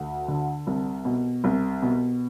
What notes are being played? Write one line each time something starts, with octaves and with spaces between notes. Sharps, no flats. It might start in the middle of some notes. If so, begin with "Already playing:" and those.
Already playing: D2
D3
C2
B2
C2
B2